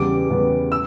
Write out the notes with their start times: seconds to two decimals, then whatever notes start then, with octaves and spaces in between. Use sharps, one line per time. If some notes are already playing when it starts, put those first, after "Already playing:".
Already playing: E2 C#3 G3 B3 D6
0.30 E2 C#3 G3 B3
0.72 E6